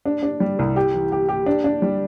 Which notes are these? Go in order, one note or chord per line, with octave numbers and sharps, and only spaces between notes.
D4
D4
G3
C2
G4
E3
G4
G4
D4
D4
G3